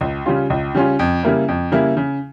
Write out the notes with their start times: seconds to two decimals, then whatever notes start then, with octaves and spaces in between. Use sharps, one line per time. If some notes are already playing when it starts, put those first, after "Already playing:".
0.01 C#2
0.26 C#3 G3 C#4 F4
0.50 C#2
0.75 C#3 G3 C#4 F4
0.99 F2
1.23 C#3 G3 A#3 E4
1.48 F2
1.72 C#3 G3 A#3 E4
1.97 C#3